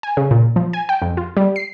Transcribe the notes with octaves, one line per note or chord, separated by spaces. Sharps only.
G#5
C#3
A#2
F3
G#5
G5
F2
F4
G3
C7